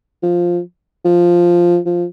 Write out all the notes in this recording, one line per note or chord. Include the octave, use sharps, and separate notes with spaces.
F3
F3
F3